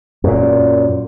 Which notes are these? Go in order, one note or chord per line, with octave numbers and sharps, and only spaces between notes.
F#2 A#2